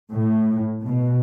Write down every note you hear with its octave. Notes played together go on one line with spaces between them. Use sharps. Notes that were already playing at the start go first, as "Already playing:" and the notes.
A2
B2